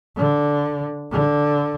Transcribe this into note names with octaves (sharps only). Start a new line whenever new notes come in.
D3
D3